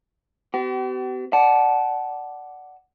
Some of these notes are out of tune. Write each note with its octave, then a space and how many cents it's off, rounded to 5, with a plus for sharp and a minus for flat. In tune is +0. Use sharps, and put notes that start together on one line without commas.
B3 +45 G4 -45
D5 +0 F#5 +10 A5 -20